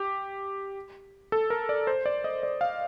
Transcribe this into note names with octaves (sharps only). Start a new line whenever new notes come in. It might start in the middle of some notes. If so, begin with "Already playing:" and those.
Already playing: G4
A4
A#4
D5
C5
D5
D#5
D5
F5